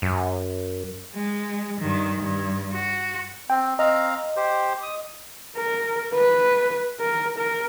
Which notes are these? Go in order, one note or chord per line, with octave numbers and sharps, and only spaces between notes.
F#2
G#3
G2 D#3
G2
F#4
C4 G5
C4 D#5 F5 A#5
G4 C5
D#6
A#4
B4
A#4
A#4